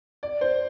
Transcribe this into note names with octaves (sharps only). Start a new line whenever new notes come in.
D5
C5